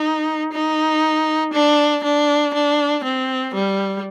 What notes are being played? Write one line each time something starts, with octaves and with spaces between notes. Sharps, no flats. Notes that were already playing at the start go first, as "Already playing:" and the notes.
Already playing: D#4
D#4
D4
D4
D4
C4
G3